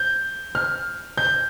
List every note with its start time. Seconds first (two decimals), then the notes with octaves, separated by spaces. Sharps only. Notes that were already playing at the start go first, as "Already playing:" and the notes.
Already playing: G6
0.55 F6
1.17 G6